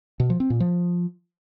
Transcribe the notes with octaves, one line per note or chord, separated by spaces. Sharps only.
B2
F3
C4
A#2
F3